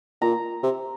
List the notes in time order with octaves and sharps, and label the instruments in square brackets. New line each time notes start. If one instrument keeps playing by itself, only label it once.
[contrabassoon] A#2 [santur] A#5
[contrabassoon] C3